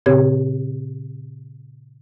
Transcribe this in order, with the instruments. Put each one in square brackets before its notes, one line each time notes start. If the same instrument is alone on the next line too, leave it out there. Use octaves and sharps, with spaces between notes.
[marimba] A#2 C#3 C4 G4 C#5 G#6